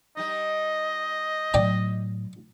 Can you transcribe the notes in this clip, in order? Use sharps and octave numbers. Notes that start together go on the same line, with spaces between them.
G3 D#4 D#5
A2 F#3 D5 G5 A5